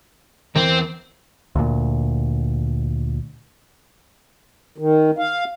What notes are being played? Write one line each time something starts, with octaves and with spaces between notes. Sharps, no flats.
E2 E3 C4 A#4
D2 A#2
D#3
F5